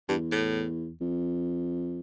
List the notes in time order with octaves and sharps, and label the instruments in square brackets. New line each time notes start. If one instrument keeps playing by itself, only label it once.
[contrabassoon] E2 [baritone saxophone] G2
[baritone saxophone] A2
[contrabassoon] F2